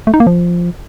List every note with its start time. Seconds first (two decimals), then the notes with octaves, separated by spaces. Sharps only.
0.07 A3
0.14 D#4
0.20 A#3
0.27 F3